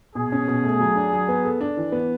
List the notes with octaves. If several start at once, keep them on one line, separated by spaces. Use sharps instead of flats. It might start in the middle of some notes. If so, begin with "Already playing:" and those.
B2 G#4
C#4
B2
A3
F#3
D4
F#3
B3
A4
D4
E3
B3